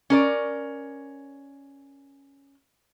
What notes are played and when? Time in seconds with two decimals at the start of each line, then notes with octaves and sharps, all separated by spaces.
0.10 C#4 A#4 D5